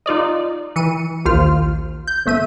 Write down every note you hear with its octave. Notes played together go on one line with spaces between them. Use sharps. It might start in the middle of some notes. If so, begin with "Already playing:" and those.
D#4 F4 D5 D#5
E3 C#7 D#7
A#1 D#2 F4 C5 F6
G6
G1 A3 E5 D#7